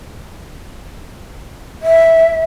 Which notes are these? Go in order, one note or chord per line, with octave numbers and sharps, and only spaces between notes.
E5